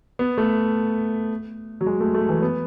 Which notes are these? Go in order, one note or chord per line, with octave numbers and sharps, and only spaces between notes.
B3
A3
F#3
G#3
A3
A3
E3
B3